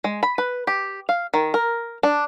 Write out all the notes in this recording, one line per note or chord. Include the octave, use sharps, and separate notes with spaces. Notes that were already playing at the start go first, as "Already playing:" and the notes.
G#3
B5
B4
G4
F5
D#3
A#4
D4